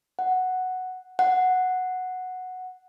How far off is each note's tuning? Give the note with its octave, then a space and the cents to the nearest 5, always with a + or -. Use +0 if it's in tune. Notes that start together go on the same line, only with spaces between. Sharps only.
F#5 +0
F#5 -5